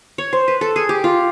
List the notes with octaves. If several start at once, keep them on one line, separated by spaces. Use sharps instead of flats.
C#5
C5
B4
A4
G#4
G4
F4